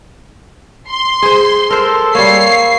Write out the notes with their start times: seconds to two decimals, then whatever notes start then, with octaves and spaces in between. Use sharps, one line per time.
0.90 C6
1.22 G#4 C5
1.70 A4 A#4 C5
2.15 G3 A#3 C#5 C7